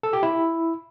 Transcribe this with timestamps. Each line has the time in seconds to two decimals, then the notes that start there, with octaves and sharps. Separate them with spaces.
0.03 A4
0.13 G4
0.23 E4